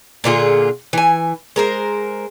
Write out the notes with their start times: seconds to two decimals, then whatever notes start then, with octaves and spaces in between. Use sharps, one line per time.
0.24 A#2 D3 F4 G#4
0.93 E3 G#5
1.56 G#3 A#4 C5